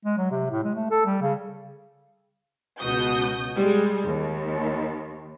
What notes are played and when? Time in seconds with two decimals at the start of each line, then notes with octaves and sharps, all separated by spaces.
0.05 G#3
0.17 F#3
0.31 C3
0.51 A2
0.63 G#3
0.75 A3
0.91 A4
1.06 G3
1.22 C#3
2.80 C#2 B2 F#4 D#6 G6
3.58 G3 G#3
4.05 D#2